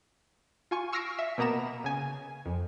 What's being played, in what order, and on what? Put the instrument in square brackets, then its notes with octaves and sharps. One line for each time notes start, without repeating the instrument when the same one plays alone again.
[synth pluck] F4 G#5 C#6
C#6 E6 F6 A#6 C7 D7
E5
B2 A#3 B3 A#5 E7
C#3 G#5
F2